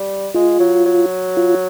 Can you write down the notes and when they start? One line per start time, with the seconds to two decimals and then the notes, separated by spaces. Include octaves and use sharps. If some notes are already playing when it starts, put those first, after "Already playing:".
Already playing: G3
0.34 G#3 F4
0.60 F#3
0.85 F#3
1.37 F4